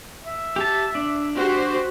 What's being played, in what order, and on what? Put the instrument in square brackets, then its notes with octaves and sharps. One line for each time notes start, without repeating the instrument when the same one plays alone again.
[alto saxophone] E5
[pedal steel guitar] G4 A5
D4
[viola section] F#4 G4 C5